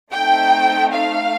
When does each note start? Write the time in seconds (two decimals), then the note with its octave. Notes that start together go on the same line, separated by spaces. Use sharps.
0.13 A3 C4 D#4 G5
0.94 F5